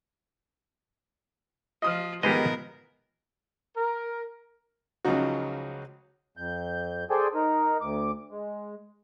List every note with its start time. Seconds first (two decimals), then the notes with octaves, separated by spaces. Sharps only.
1.82 F3 F4 D#5 D#6 F6
2.23 G#2 D#3 F3 B3 G4 G#4 A#4 D#5
3.77 A#4
5.05 C#2 C#3 F3 F#3 D#4 F#4
6.37 F2 G6
7.10 G#4 A4 C5 D5 G5 G#5
7.34 D#4 A#4
7.81 D2 D6
8.31 G#3